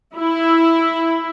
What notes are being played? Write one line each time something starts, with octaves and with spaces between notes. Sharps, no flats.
E4